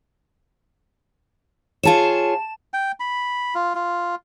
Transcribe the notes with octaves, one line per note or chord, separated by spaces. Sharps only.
F4 G#4 C#5 A5 E7
G5
B5
F4
F4